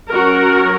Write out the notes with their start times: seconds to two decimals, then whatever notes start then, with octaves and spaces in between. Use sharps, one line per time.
0.13 F#3 C#4 F#4 A#4